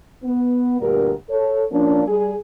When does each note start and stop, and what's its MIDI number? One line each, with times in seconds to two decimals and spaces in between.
0.24 0.80 59
0.80 1.11 38
0.80 1.11 43
0.80 1.11 46
0.80 1.11 67
0.80 1.11 70
1.30 1.64 69
1.30 1.64 73
1.71 2.06 53
1.71 2.06 58
1.71 2.06 61
1.71 2.06 62
2.07 2.33 55
2.07 2.33 68